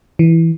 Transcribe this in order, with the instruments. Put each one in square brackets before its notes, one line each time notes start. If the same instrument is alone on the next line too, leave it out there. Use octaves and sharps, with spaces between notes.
[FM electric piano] E3